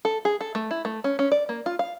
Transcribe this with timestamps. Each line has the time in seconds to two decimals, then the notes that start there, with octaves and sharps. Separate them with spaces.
0.05 A4
0.25 G#4
0.41 A4
0.55 A3
0.71 E4
0.85 A3
1.04 C#4
1.19 C#4
1.32 D5
1.49 A#3
1.66 F4
1.79 F5